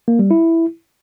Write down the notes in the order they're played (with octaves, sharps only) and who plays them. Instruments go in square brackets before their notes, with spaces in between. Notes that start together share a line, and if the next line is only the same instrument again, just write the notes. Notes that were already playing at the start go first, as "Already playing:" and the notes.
[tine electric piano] A#3
G3
E4